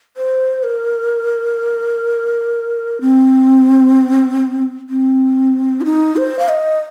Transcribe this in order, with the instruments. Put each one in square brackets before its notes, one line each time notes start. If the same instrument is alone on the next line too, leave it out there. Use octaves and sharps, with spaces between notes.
[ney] C5
A#4
C4
C4
F4
D#4
C5
F5
D#5